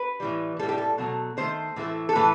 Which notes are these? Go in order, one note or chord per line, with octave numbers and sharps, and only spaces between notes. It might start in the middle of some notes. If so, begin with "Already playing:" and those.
Already playing: B4
A2 E3 G3
A2 G3 A4
G4
A4
B2 F#3 A3
D#3 A3 C5
A2 E3 A3
A4
A2 E3 A3 B4